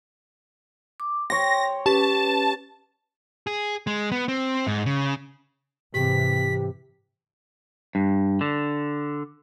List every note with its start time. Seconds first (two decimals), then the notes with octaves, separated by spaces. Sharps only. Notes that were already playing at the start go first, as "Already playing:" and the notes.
1.00 D6
1.30 C#5 G5 C6 A#6
1.86 C#4 G4 B4 A5
3.47 G#4
3.87 G#3
4.12 B3
4.28 C4
4.67 G#2
4.86 C#3
5.94 G#2 C3 E3 G4 B6
7.95 G2
8.41 D3